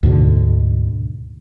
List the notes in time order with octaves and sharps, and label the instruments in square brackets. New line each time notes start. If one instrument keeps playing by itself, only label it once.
[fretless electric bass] D2 G#2 B2 D3